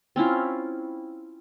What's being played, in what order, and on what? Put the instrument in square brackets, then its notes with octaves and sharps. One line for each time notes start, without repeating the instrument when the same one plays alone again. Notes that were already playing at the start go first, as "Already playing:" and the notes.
[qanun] C4 C#4 E4 F4